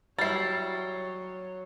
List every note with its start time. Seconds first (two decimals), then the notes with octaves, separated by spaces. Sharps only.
0.19 F#3 G3 E4 C#5 A6 C7